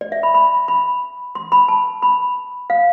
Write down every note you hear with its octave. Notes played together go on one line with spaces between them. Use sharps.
D5
E5
B5
B5
B5
C6
B5
A5
B5
F5